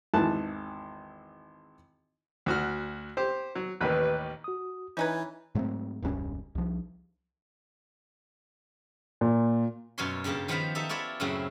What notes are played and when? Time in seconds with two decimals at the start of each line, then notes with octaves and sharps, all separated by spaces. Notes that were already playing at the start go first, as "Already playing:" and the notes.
0.14 G#1 E2 D#3 E3 A5 F#6
2.46 D2 F#4 F6
3.17 G4 C5
3.55 F#3
3.81 A1 D#2 D#3 B4
4.44 F#4 D#6
4.97 E3 C#4 D#4 B4 G6 G#6
5.55 G#2 F#3 A3 C4
6.03 E1 C#2 G2 C#4
6.55 C2 F3
9.21 A#2
9.98 F#2 B2 A#3 F4 C#5 C6
10.24 G2 C#3 A#3 G4 A5
10.48 D#3 F3 B3 C5 F5 B5
10.75 D#4 G4 A4 E5
10.89 E4 F4 C#5 D5 E5
11.20 F#2 A2 C#3 F#3 C4 E4